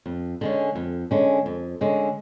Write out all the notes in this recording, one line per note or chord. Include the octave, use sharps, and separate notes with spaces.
F2
D3 G#3 C#4
F2
D3 G#3 C#4
F2
D3 G#3 C#4